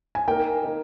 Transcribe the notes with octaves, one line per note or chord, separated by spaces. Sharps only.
G#5
A#3 D#4 A#4 G5
A#3 D#4 A#4